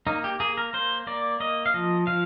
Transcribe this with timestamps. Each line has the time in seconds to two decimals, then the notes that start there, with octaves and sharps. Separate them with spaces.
0.07 A#3 D#4
0.24 G4
0.40 A#3 G#4
0.57 A#4
0.73 A#3 C5
1.07 A#3 D5
1.40 A#3 D#5
1.66 F5
1.74 F3 D#5
2.07 F3 F5